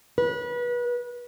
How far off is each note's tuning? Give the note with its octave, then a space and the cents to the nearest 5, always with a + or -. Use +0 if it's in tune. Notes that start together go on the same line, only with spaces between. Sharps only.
B4 -30